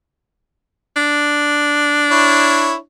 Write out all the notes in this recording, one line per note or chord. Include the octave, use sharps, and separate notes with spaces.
D4
E4 C#5